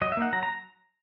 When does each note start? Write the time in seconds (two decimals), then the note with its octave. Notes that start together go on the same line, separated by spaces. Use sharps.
0.02 F#3 D#5
0.12 E5
0.17 A#3 D#4 F#5
0.33 F#3 A#5
0.43 A#5